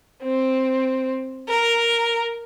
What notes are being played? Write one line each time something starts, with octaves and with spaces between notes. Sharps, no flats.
C4
A#4